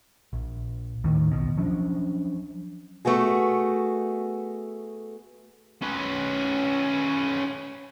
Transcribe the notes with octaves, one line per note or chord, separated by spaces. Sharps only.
A#1
D#2 A2 D#3
A#1 D#2 B2
F3 F#3 C#4 D4
A3 B3 F#4 G#4
C#4 B4